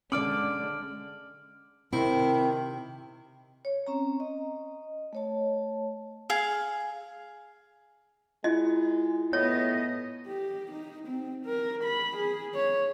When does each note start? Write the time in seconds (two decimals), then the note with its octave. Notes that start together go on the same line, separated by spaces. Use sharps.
0.12 D3 G#3 C#4 D5 D6 F6 D7 F#7
1.93 C3 D#3 C4 E4
3.65 C#5
3.87 C4 C#4 A#5
4.20 D#5
5.13 A3 C#5 A5
6.30 G#4 F5
8.44 G#3 E4 F4 D#5
9.33 A2 B3 C#5 D#5
10.26 G4
10.72 D#4
11.08 C4
11.46 A#4
11.84 B5
12.17 G#4
12.55 C#5